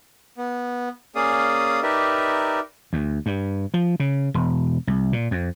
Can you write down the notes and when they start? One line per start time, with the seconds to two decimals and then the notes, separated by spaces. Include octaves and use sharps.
0.38 B3
1.15 A#3 C#4 G#4 D5 F5 D#6
1.82 D#4 G4 A#4 B4 D5 E5
2.93 D2
3.26 G2
3.74 F3
4.00 C#3
4.34 E1
4.87 C2
5.13 A#2
5.31 F2